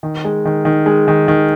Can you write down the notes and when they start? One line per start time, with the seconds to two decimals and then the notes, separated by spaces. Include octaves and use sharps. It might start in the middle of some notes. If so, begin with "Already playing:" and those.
0.03 D#3
0.25 G#3
0.45 D#3
0.65 D#3
0.86 G#3
1.08 D#3
1.28 D#3